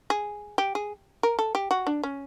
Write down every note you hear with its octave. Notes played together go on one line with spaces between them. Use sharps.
G#4
G4
G#4
A#4
A4
G4
F#4
D4
C#4